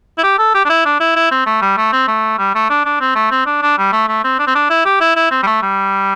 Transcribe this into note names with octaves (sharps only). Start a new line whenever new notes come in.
E4
G4
A4
G4
D4
E4
D4
E4
E4
C4
A3
G3
A3
C4
A3
G3
A3
D4
D4
C4
A3
C4
D4
D4
G3
A3
A3
C4
D4
C4
D4
E4
G4
E4
E4
C4
G3
A3
G3